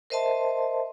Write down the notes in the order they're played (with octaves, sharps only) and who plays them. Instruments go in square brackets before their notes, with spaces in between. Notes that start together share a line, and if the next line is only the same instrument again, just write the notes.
[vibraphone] A#4 C5 D#5 E5 A5 C6